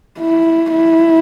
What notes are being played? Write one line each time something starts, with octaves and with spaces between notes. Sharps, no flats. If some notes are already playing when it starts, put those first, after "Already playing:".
E4
E4